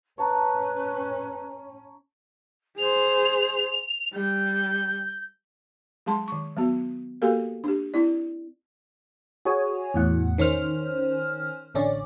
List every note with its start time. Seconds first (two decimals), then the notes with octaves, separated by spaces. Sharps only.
0.18 C#4 B4 C#5 A5 A#5
2.78 G#4 C5 F7
4.13 G3 G6
6.06 F#3 G#3 G#4 A5 C6
6.28 D#3 C#6
6.56 F#3 B3 F#4
7.22 A#3 F#4 G4 A4 A#4 F5
7.64 D4 G4
7.94 C4 E4 D5
9.45 F#4 G#4 C#5 G#5
9.94 E2 A2 F#5
10.38 D#3 C#4 C5 F6
11.75 A1 D3 C#4 D5